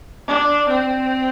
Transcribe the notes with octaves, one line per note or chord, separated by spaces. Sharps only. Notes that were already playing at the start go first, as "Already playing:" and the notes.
D4
C4